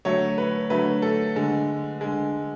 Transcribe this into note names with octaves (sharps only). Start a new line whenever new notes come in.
D3 F#3 A3 C#5
B4
D3 F#3 A3 B4
A4
D3 G#3
D3 G#3